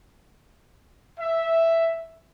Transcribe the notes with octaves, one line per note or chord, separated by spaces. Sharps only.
E5